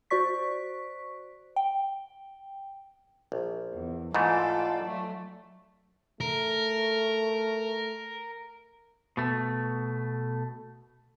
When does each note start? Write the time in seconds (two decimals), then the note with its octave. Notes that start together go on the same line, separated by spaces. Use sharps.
0.10 F#4 C5 D5 C#6 B6
1.56 G5
3.32 A#1
3.74 E2
4.14 G#2 E3 A3 F4 A4 D5
4.82 F#3 A3
6.21 A3 A#4
9.17 B2 A3